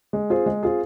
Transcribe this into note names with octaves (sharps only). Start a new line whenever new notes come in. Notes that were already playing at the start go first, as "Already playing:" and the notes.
G#3
C4 F4 G#4
G#3
C4 F4 G#4